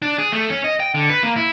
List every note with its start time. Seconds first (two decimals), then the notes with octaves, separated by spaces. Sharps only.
0.02 D4
0.18 G#4
0.32 A3
0.50 C#4
0.64 D#5
0.80 G5
0.94 D3
1.09 B4
1.23 A#3
1.36 E4